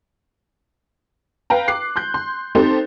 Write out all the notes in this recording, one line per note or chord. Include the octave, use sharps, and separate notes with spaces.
B4 F5 G5 A#5
D6 F#6 C7
C6 F#6 G6
C6
C4 D#4 G4 A4 C5